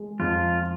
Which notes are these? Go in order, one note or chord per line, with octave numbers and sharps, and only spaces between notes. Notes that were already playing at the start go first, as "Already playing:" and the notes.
Already playing: G#3
F2 F4